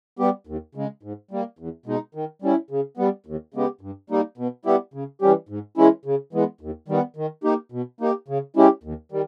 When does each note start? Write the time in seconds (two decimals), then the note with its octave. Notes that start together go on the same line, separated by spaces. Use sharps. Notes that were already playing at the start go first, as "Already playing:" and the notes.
0.19 G3 B3 G4
0.47 D#2
0.75 C#3 G#3
1.03 G#2
1.31 G3 A#3
1.59 E2
1.86 B2 G#3 D#4
2.15 D#3
2.42 G3 C#4 E4
2.71 C#3
2.97 G3 B3
3.26 D#2
3.54 C#3 G#3 B3 G4
3.81 G2
4.10 G3 A#3 D#4
4.38 B2
4.65 G3 B3 E4 G4
4.94 C#3
5.21 E3 G3 C#4 G4
5.49 G#2
5.77 E3 G#3 C#4 E4
6.05 C#3
6.33 E3 G#3 B3
6.61 D#2
6.88 D#3 G3 B3
7.16 D#3
7.44 A#3 D#4 G4
7.72 B2
8.01 A#3 D#4 G4
8.28 C#3
8.56 G#3 C#4 E4 G4
8.84 D#2
9.12 D#3 G3